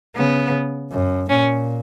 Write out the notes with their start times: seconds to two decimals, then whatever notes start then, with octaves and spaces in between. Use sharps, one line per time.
0.15 C#3 B3
0.91 F#2
1.29 A#2 C#4